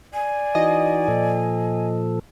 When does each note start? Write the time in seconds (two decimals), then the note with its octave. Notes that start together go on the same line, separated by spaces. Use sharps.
0.14 D5 G#5
0.55 E3 D#4 F#4 D#5
1.08 A#2 F3 A4